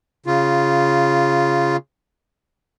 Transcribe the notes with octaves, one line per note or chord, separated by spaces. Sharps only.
C#3 F4